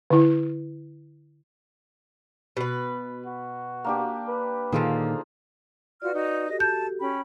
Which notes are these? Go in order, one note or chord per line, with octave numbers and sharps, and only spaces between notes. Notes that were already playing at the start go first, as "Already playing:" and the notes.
D3 E4
B2 B4
F#4
A#3 D4 G4
B4
A#2 D3 D#3 F3 A#3 D#4 F4 G#4
F4 F#4 B4 D5 F6
D#4 F#4
F#4 G4 A4 D#5
A5 G6
C#4 G5 B5